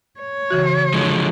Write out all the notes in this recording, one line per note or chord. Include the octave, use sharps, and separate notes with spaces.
C#5
C#3 E3 F#4
D3 F3 G#3